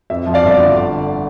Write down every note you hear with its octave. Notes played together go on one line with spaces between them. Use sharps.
F2 E5
F3
D5 F5
G1 E5
D3